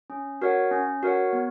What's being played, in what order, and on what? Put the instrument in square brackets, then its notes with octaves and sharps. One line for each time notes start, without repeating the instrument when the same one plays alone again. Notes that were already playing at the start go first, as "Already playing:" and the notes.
[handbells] C#4
F#4 A#4 C#5 F#5
C#4
F#4 A#4 C#5 F#5
B3